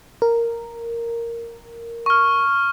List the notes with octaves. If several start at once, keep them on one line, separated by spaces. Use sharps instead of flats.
A#4
C#6 F6